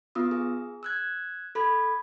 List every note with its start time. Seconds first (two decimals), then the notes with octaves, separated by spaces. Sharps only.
0.15 B3 F4 D#6 E6
0.31 G#4
0.83 E6 F#6 G#6
1.55 A4 B5 G#6